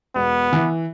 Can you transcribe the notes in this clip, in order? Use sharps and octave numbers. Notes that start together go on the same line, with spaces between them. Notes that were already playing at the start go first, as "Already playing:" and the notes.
E1 B3
E3